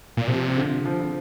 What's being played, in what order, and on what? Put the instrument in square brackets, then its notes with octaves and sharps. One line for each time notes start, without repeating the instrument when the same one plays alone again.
[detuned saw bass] A#2
[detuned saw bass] C3 [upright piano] F3
[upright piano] D3
F3
F3